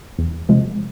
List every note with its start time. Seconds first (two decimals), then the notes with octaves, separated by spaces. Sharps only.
0.19 E2
0.49 C3 F3 G#3